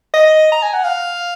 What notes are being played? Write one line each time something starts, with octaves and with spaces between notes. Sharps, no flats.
D#5
A#5
G#5
F#5
F5